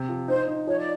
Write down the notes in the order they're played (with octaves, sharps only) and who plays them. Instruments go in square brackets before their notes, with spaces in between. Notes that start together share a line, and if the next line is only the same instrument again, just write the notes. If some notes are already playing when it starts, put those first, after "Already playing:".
Already playing: [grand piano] C3
F3
[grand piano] D#4 [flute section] C5
[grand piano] D#4
[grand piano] F3 [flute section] C#5
[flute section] D5